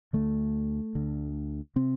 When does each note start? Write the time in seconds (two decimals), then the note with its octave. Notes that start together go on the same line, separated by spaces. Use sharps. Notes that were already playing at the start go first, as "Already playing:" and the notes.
0.13 D2 D3 A3
0.95 D2 D3
1.76 C3 C4